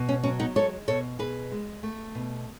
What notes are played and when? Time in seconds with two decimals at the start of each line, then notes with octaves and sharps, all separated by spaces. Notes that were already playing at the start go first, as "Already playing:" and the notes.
Already playing: B2
0.09 C#4
0.23 F#3 C#4
0.40 B3 D#4
0.55 G#3 A4 C#5
0.88 B2 A4 C#5
1.19 B2 G#4 B4
1.52 G#3
1.83 A3
2.15 B2